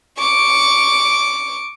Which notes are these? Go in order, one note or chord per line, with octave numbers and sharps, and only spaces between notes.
C#6 D6